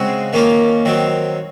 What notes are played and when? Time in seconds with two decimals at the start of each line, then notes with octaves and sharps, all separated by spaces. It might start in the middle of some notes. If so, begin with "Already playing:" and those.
Already playing: C#3 G#3 C4 F#4
0.33 D#3 A#3 C#4 F4
0.85 D#3 F#3 C4